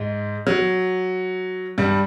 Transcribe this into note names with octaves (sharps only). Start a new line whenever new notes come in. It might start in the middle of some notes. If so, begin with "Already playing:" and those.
Already playing: G#2 G#3
F#3
G2 G3